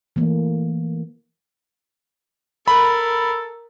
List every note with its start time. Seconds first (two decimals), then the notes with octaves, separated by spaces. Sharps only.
0.16 E3 A3 A#3
2.68 A4 A#4 B5